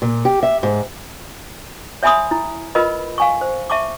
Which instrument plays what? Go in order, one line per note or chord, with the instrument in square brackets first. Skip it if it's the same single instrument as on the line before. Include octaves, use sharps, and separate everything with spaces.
[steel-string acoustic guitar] A#2
G4
E5
G#2
[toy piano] C#5 E5 G#5 B5 C6 D#6
E4
F4 A#4 B4 D#5 B5
F5 G#5 C#6
C5
E5 A5 C#6 D6